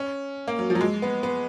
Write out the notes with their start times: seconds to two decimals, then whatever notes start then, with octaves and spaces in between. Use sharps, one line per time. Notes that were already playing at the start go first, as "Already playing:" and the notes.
Already playing: C#4
0.48 A#3
0.59 F#3
0.70 F3
0.75 F#3
0.81 G#3
1.02 B3
1.23 B3